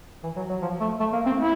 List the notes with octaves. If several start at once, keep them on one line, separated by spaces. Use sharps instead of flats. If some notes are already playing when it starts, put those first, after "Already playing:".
E3
F#3
F#3
F3
A3
A3
A#3
C4
E4